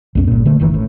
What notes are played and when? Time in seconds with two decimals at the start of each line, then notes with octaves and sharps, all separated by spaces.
0.15 B1 F#2 G3 C#4
0.27 G1 A#2
0.46 D3 A3
0.60 F#1 D#3 E3
0.72 A1 A2